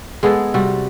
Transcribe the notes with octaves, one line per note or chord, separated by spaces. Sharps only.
G#3 B3 G#4 A4
C3 G3 F#4